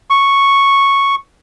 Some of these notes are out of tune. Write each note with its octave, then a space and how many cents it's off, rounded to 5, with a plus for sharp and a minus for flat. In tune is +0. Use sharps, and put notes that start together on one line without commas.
C#6 -5